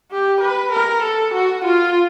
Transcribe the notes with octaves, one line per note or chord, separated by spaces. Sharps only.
G4
B4
A#4
A4
F#4
F4